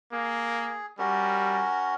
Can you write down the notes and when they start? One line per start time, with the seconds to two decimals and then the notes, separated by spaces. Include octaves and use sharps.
0.12 A#3 G#4
0.99 G3 C#4 F#4 A#4